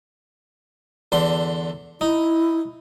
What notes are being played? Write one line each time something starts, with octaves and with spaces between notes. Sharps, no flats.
E2 D3 C6
D#4 E4